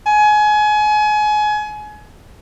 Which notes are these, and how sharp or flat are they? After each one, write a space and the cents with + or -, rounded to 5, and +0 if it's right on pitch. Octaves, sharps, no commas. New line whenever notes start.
G#5 +25